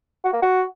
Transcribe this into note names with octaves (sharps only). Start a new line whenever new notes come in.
F#4
A#3
F#4